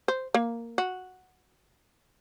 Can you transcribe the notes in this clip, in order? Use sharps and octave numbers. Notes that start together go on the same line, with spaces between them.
C5
A#3
F#4